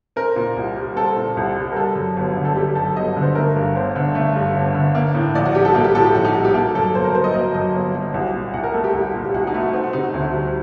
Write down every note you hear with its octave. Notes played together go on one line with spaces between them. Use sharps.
C4 A#4
A#2
C2
G3
C4 A4
A#2
C2
G3
A#4
G3 A4
F#2
G1
D3
A4
G3 G4
F#2 A4
G1 D#5
D3
C5
A3 A#4
G2
G1 C5
D3
A3
G2
G1
D3
A#3
A2
A#1 D5
F#4
G3 G4
A4
A#3 F#4
G4
A2 A4
G4
A#1 F#4
D#4
G3 F#4
G4
A#3 A4
F#2 A4
G1 C5
A#4
F#3 C5
D#5
A#3 D#5
F#2 D#5
G1
F#3
C2
A#2
C2 F#5
A#4
A3 A4
G4
C2
A#2
G4
C2 F#4
D#4
A3
F#4
C4 D#4
F#4
C3 D#4
F#4
D2
G3